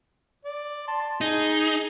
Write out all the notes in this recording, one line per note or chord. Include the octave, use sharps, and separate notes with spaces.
D5
A5 C6
D#4 G#4